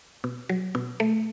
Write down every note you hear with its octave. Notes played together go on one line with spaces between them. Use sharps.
B2
F#3
B2
A3